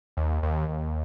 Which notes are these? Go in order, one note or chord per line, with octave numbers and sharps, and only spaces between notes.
D#2
D#2
D#2